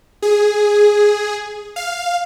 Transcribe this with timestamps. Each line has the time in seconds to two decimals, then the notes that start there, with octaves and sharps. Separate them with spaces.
0.22 G#4
1.76 F5